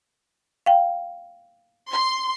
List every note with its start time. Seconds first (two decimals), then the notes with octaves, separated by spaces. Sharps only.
0.66 F5 G5
1.91 C6